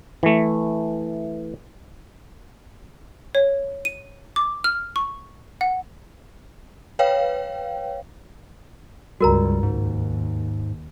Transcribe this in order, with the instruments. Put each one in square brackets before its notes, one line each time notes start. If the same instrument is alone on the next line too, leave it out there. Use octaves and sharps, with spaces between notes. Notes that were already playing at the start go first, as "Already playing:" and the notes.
[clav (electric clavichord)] E3 A3
[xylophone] C#5
D#7
D6
F6
C#6
F#5
[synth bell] B4 C#5 F5 G5
[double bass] C#2 G2 [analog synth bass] G3 [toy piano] F#4 A#4 A#5
[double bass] D#2 [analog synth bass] G#2